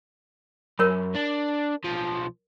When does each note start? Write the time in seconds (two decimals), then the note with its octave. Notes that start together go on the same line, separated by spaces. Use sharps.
0.79 F#2 A#4 C#5 B5
1.15 D4
1.84 B1 F3